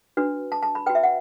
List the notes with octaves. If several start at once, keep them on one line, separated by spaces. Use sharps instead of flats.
D4 F#4 B4
A5
A5
B5
F#4 B4 G5
E5
F#5